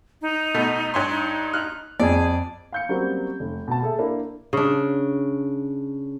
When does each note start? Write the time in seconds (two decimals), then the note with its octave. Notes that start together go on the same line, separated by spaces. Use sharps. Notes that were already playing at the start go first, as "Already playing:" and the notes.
0.22 D#4
0.54 B2 A3
0.94 G2 C#5 C6
1.09 D#4
1.53 F6 F#6
2.00 F2 G#4 D5
2.72 F5 G6 C#7
2.89 F#3 G3 A#3 C4 C#4
3.40 F1
3.68 B2 A5
3.82 G#4 A4 E5
3.99 A#3 D4 E4
4.53 C#3 D4